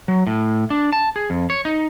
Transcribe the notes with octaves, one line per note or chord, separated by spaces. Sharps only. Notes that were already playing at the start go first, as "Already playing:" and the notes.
F#3
A2
D4
A5
G#4
F2
C#5
D#4